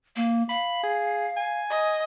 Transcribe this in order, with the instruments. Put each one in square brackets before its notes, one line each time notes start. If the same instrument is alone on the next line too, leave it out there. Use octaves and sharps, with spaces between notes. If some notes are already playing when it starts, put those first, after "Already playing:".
[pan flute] A#3
[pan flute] F5 [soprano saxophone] B5
[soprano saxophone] G#4
G#5
[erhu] D#5